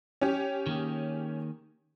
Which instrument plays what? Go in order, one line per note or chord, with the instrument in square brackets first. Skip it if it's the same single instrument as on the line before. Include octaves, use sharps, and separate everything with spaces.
[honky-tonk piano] C#4 G4
[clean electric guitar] D#3 A#3 G#4